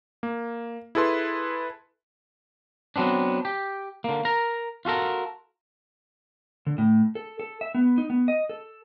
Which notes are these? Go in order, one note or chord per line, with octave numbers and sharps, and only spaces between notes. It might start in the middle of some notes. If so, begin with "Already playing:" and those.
A#3
E4 G#4 A4 B4 C6
F#3 B3 C4 D4
G4
D3 A#3
A#4 A#5
F4 F#4 A4 A#4
D3
A2
A4
A4
E5
B3
D#4
B3
D#5
A4